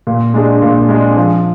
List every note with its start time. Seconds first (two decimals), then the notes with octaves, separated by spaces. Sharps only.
0.07 A#2
0.34 G#3 D4 G#4
0.62 A#2
0.89 G#3 D4 G#4
1.16 F3